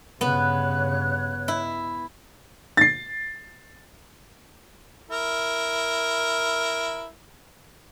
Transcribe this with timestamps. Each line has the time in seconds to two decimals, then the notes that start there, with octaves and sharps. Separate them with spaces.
0.21 G2 C#3 B3 C#5 F#6
1.48 E4
2.77 A6 C7
5.11 E4 A#4